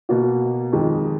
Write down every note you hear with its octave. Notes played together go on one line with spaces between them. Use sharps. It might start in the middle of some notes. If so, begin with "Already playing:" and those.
B2 A#3 F#4
F2 D#3 G#3